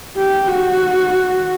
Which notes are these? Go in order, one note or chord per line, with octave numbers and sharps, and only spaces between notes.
G4
F#4